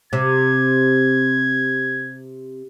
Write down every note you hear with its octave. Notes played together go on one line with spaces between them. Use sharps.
C3 G#6